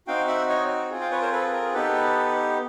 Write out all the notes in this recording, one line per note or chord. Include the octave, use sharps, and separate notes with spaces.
C4 D#4 F#4 F5 G5
E5 F#5
C#5 D#5
C4 F4 G#4
F5 G5
B4 C#5
A#4 C5
A4 B4
A#4
B3 D#4 G4 A4 B4